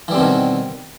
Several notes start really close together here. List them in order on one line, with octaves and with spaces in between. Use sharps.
E3 G3 C4 B2 D#3